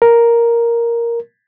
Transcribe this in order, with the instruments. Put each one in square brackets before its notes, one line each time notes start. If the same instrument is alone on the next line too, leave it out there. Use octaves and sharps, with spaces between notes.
[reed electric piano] A#4